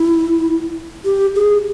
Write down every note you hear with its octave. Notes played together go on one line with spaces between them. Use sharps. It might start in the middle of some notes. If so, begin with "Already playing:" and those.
Already playing: E4
G4
G#4